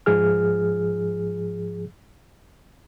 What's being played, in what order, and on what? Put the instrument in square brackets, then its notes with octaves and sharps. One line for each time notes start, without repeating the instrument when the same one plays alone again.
[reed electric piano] G#2 F3 G#4 F6